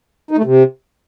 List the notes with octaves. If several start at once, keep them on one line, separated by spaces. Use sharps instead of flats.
D#4
A3
C3